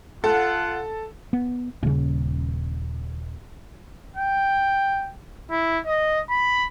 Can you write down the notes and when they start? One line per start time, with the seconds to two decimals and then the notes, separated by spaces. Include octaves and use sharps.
0.24 F4 A4 F#5
1.33 B3
1.83 D#1 C#3
4.16 G5
5.51 E4
5.86 D#5
6.30 B5